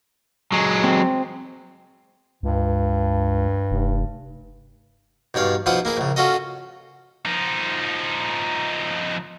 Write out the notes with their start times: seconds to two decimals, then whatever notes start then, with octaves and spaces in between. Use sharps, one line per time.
0.52 F#3 G#3
0.83 C4
2.43 C#2 G2
3.72 F1
5.34 B1 G2 C#5 D5 F5
5.66 B1 F3 E4 F4 F#5 D#6
5.85 A#3 E4 G#4
5.97 A#1 C#3
6.16 C#4 F4 F#4 A4 D#5
7.25 F3 D#4